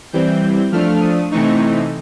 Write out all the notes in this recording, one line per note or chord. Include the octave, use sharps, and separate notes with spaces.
E3 G3 C4 G6
F3 A3 D4 F6
D#6
C3 E3 A3 C4 D#4 C#6